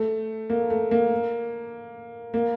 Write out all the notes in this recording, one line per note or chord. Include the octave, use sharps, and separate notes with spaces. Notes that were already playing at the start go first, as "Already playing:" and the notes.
Already playing: A3
A#3
A3
A#3
A#3